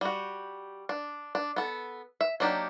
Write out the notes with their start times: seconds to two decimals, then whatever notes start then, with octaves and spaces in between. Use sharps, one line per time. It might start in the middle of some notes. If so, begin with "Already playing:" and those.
0.01 G3 F#4
0.89 D4
1.35 D4
1.56 B3 A4
2.21 E5
2.40 F#3 A#3 D4 D#4 G4